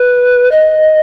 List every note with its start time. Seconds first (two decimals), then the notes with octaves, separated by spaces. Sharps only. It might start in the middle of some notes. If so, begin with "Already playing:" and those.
Already playing: B4
0.51 D#5